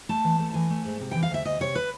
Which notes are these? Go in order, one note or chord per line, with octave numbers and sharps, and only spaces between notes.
A3 A5
E3
A3
A5
E3 G#5
A3
G#2
C3
E3 G5
F5
D2 E5
D2 D#5
C3 C#5
B4